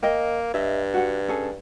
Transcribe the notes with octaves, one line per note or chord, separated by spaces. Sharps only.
A#3 A#4 D#5 G5
G2 D#5 E5
F#4 F#5
C#4 G#4 A4